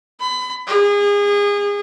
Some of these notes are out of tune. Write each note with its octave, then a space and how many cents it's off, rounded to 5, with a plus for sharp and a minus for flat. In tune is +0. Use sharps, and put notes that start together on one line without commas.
B5 +30
G#4 -30